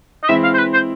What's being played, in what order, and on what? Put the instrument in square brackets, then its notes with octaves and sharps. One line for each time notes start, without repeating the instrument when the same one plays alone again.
[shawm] D#5
[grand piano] E3 G#3 C4 E4 [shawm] E5
[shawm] F5
C5
B4
C5